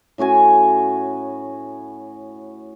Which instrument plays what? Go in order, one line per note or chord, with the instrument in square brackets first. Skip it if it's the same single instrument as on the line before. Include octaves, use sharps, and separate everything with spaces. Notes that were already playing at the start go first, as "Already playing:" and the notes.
[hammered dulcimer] A2 C#4 F#4 G#5